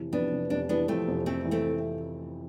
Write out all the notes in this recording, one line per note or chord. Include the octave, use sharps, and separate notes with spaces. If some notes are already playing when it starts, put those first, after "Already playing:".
Already playing: F1 E3
F2 B3 D4
F1
F1 D4
E3 B3 D4
F2 A3 C4
F1
F1 A3 C4
E3
A3 C4